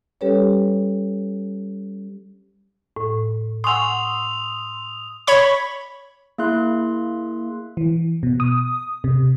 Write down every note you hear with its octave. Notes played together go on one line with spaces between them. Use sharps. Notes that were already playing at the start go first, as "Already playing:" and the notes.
G3 C#4 G4 A4 B4 C#5
A2
F#5 G#5 C6 C#6 D#6 E6 F7
C#5 B5 C#6
A#3 E4 G#4 E5 C6 F#6
E3
B2
D#6
C3